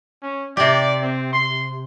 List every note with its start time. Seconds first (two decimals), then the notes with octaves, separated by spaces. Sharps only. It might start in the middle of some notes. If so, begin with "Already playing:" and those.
0.23 C#4
0.57 C3 G4 D5
1.02 C4
1.33 C6